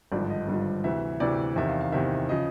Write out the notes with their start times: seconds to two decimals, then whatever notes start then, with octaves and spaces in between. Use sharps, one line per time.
0.12 G#1 G2 D3 F3 D5
0.30 D#5
0.48 G#1 G2 D3 F3
0.84 D2 C3 E3 E5
1.20 D2 C3 E3 D5
1.56 E2 C3 D#3 E5
1.69 F5
1.81 F5
1.92 E2 C3 D#3 E5
2.29 C#3 F3 D#5